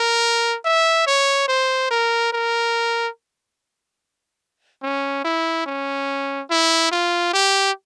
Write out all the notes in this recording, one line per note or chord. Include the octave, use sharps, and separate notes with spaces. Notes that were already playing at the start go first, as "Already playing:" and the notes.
Already playing: A#4
E5
C#5
C5
A#4
A#4
C#4
E4
C#4
E4
F4
G4